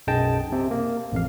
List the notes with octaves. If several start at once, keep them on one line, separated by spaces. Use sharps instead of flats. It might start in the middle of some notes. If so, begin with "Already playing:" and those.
B1 F#2 G#4 D#5 G5 A5
C3
A#3
A1 F2 F5